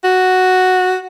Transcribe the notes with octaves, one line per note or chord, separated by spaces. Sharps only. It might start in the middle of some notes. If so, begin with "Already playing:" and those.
F#4